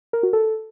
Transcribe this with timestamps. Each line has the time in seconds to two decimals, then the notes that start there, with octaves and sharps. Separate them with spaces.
0.13 A#4
0.23 F#4
0.33 A4